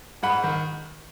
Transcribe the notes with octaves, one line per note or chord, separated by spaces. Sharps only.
G#2 F#5 B5
D#3